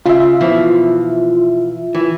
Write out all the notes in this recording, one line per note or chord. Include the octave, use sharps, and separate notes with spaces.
C#2 C#3 F4 E5
B2 E3 F3
E3